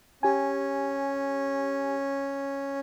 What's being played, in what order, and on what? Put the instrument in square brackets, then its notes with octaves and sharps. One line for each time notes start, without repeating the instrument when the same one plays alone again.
[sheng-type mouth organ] C#4 [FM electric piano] G4 G#5